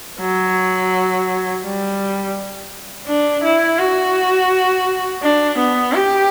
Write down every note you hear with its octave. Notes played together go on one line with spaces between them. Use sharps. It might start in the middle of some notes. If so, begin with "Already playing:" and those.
F#3
G3
D4
E4
F#4
D4
B3
G4